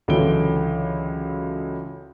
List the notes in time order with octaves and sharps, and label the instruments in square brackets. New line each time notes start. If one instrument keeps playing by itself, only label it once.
[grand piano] C#2 D3 E3 F#3 D7 G7